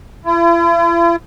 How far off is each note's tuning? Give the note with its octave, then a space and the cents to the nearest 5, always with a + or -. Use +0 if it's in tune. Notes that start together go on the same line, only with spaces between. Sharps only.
E4 +45